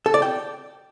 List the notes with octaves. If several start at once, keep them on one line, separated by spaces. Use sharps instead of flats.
A4
D5
G5